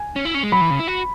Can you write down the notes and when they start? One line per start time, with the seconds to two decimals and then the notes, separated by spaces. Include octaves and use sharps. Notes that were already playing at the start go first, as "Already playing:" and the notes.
Already playing: G#5
0.16 C#4
0.25 E4
0.34 C#4
0.43 G#3
0.52 F#3 B5
0.61 E3
0.70 C#3
0.79 E4
0.88 F#4